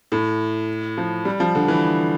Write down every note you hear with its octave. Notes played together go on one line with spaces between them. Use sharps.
A2
F3
G3
F3
D3
E3